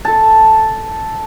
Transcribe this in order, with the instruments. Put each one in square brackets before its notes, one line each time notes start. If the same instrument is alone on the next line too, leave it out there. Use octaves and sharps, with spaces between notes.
[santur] A4 A5